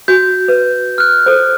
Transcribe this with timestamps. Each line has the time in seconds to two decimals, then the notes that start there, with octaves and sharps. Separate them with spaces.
0.08 F#4 G6
0.48 B4
0.98 F6 F#6
1.26 A4 C5